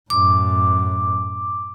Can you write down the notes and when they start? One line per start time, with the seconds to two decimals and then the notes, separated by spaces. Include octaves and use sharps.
0.10 F#2 A2 D6